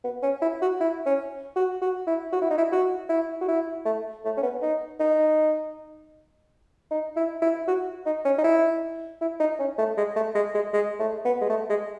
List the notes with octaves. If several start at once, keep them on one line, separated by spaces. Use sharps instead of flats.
B3
C#4
E4
F#4
E4
C#4
F#4
F#4
E4
F#4
E4
D#4
E4
F#4
E4
F#4
E4
A3
A3
C#4
B3
D#4
D#4
D#4
E4
E4
F#4
D#4
C#4
D#4
E4
E4
D#4
C#4
A3
G#3
A3
G#3
G#3
G#3
A3
B3
G#3
A3
G#3